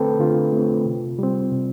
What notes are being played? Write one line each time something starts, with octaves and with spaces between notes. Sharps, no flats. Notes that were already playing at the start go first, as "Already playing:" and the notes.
Already playing: D3 A3 C4 A4 B4 G5
D3 F4
A3 C4
C3
G3 C4
C3